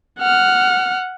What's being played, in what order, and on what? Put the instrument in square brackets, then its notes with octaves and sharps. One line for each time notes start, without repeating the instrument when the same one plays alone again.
[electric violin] F#5 F6